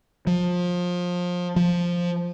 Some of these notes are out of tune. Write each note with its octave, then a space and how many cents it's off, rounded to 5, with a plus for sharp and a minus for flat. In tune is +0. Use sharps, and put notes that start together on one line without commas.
F3 +25
F3 +5